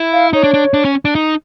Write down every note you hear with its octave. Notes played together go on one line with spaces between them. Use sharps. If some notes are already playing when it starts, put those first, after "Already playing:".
Already playing: E4
F5
D#4 C#5
D4
D4
D4
C#4
D4
D#4